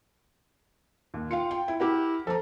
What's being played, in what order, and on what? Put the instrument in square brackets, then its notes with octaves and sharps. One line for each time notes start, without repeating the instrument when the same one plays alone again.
[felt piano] D#2
[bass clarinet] F4 [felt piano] F5 G5 C#7
[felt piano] G5
E4
[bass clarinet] E4 [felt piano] G4 A#4 F#5
[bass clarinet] F3 [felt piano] A4 A#5